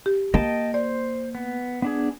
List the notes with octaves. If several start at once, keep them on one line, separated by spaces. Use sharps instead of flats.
G4
A#3 D#5 G5 A5
C5 D5
B3
B3 D4 G#4